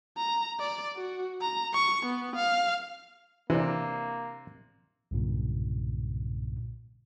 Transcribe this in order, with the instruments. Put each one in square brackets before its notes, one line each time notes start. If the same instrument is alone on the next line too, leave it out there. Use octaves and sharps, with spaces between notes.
[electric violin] A#5
D5
F#4
A#5
C#6
B3
F5
[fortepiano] C3 D4 [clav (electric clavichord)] E3 [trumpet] A#3
[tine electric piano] B1 G2 A#2 C#3